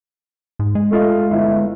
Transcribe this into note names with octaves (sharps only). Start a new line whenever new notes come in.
G#2
G#3
A3 F4 D#5
G1 E4